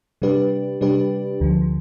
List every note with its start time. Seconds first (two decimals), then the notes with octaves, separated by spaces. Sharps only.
0.22 C3 G3 D4 G4 B4
0.81 C3 G3 D4 G4 B4
1.41 D2 D3 F3